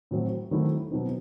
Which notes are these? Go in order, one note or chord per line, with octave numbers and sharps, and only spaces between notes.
A2 F#3 C4
D#3 F#3 A3 C4 E4
B2 F#3 C4 D#4